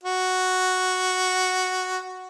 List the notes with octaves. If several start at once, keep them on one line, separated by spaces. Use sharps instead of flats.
F#4